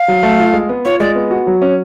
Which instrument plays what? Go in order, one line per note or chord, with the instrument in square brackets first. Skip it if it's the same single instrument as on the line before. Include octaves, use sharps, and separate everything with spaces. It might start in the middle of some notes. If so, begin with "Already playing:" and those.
Already playing: [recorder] F5
[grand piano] F#3
A3
F4
G#3
B3
[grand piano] F4 [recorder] C#5
[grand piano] G#3 [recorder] D5
[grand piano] B3
F#4
F#3
C#4